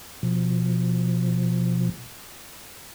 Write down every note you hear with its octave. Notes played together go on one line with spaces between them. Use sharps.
B2 F3